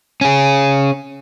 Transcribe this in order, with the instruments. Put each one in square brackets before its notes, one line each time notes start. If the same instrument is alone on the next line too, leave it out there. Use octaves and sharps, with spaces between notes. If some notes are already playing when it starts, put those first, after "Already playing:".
[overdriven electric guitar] C#4 G#4